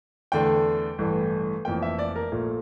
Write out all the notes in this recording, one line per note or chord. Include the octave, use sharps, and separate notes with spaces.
E2 D3 A3 G5
A1 G2 E3 A3
F1 F2 E3 A#3 G5
E5
D5
A#4
A#1 A#2 A3